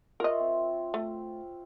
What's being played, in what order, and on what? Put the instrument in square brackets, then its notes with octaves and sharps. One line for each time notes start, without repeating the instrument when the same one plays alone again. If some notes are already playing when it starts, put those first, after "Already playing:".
[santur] F4 C#5 E5 [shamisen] A#4 D#5
[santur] C4
[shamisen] A3